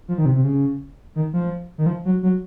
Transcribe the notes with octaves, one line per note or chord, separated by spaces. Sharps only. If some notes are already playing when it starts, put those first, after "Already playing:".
F3
D#3
C3
C3
C#3
D#3
F3
D#3
F3
F#3
F#3